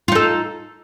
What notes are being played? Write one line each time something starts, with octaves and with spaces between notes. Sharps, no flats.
D#4 F4 A4